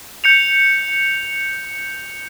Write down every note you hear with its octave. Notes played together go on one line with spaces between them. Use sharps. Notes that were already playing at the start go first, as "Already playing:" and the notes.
G6 C#7 F7